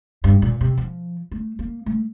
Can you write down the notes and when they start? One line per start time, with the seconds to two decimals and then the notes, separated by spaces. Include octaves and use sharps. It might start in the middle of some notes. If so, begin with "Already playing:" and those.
0.24 G2
0.42 A#2
0.61 C3
0.78 F3
1.31 A3
1.59 A#3
1.86 A3